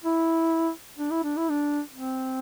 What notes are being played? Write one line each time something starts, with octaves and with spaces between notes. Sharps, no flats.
E4
D4
E4
D4
E4
D4
C4